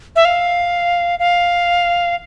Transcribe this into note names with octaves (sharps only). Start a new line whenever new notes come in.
E5
F5
F5